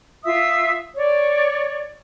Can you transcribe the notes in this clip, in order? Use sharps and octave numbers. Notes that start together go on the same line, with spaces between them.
F4 E5 D#6 E6
C#5 D5